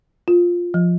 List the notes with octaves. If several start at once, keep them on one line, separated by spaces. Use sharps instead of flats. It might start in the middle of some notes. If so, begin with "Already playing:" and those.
F4
F3